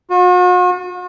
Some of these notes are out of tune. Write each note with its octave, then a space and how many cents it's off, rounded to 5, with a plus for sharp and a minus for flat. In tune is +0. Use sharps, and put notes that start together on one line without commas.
F#4 -45